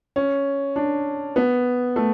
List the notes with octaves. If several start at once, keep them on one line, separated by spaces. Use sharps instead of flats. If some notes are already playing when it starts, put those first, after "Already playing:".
C#4
D4
B3
A3